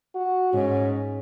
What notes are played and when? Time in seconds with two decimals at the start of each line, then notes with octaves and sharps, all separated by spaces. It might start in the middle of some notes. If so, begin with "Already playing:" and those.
0.15 F#4
0.53 G#2 C#4